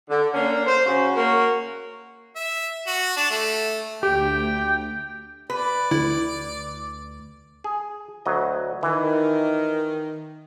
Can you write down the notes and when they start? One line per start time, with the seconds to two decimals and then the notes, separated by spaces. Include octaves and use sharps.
0.09 D3
0.32 A#3 C#4 D4
0.65 C5
0.86 C#3 F#4
1.15 A#3 F#4 A#4 C#5
2.36 E5
2.87 F#4
3.17 D4
3.30 A3
4.03 D2 G4 G5
5.50 B4 D5
5.91 D2 E4
7.64 G#4
8.26 D2 F#3 D#5
8.83 D#3 E3